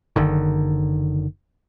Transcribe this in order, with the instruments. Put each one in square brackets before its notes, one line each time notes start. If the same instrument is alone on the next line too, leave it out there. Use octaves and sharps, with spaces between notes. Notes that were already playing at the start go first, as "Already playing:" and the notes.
[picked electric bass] F#1 D3 D#3